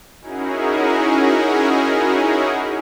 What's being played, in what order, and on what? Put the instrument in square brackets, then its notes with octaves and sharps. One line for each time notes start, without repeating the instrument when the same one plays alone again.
[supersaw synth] C#4 D#4 E4 F#4 G#4 A#4